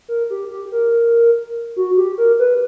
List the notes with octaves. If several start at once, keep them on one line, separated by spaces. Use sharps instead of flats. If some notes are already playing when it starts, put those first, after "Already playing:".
A#4
G4
G4
A#4
F#4
G4
A#4
B4